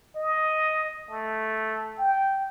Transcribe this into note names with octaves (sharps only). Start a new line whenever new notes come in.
D#5
A3
G5